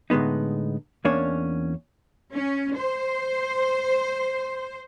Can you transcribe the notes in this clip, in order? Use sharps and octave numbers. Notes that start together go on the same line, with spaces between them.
A2 D3 G#3 B3 D#4
E2 A#3 C#4 D4 C#5
C#4
C5